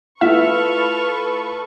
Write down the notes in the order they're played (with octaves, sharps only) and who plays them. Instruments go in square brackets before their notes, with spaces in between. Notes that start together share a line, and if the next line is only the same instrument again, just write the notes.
[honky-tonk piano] A3 E4 F4 [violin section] A4 B4 C#6 [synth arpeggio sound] E5 [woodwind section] F6